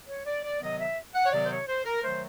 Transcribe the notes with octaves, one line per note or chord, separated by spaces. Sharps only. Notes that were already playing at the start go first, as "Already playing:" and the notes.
C#5
D5
D5
C3 D#3 F#3 B3 D#5
E5
F#5
C#5
C3 D#3 F#3 B3 D5
C5
C#5
C5
A#4
D#3 F#3 A3 C5